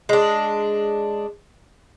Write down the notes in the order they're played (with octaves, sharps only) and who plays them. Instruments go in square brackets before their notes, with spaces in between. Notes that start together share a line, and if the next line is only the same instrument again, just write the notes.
[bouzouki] G#3 D4